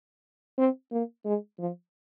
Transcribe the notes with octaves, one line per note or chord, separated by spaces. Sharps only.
C4
A#3
G#3
F3